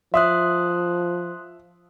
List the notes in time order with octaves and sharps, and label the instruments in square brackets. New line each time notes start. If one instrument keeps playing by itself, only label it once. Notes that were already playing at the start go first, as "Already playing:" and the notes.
[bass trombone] F3 [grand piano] E5 [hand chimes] C6 D#6 F#6